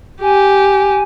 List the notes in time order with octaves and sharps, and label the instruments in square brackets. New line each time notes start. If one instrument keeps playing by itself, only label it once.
[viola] G4 [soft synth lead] G#5